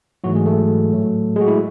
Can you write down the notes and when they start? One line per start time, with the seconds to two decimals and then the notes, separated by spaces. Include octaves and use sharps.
0.24 G#2 E3 F#3 A3 F#4
0.35 G#3 G#4
0.46 A3 A4
0.91 A2 F#3 A3
1.36 G#3 G#4
1.41 F#4
1.48 E4